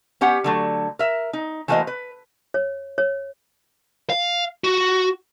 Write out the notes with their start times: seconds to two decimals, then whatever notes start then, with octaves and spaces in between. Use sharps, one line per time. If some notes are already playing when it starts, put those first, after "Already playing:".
0.21 B3 C#4 G4 F#5
0.44 D3 F#3 A3
0.99 A#4 E5
1.33 D#4
1.68 E3 A3 A#3 F#4 C5 D#5
1.87 B4
2.54 C#5
2.98 C#5
4.10 F5
4.64 F#4